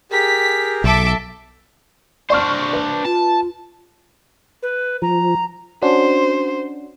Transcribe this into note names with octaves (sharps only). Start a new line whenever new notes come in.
G4 G#4 A#4 B6
B1 A4 E5 D6
D4 C5 D5 C#6 F6
B4
F4 A5
B4
F3 A#5
C#4 D4 F#4 C5